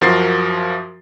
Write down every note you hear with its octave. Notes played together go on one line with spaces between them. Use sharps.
F#2 F3 F#4 A#4 A6 C7